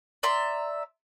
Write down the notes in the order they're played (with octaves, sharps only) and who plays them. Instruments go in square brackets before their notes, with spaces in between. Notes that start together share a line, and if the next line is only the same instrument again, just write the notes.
[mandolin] D5 E5 A#5 C6